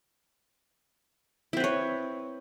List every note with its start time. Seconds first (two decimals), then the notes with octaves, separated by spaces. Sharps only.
1.53 E4
1.57 C4
1.60 B4
1.64 C#5